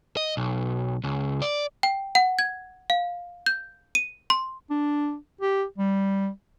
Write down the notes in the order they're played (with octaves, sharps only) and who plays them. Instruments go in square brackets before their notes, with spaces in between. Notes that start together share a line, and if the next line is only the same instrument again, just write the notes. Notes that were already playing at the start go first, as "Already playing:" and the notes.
[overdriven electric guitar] D#5
B1
C#2
D5
[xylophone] G5
F#5
G#6
F5
G6
D#7
C6
[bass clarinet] D4
G4
G3